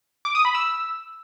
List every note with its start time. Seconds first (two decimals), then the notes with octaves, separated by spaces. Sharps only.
0.25 D6
0.35 D#6
0.45 B5
0.55 E6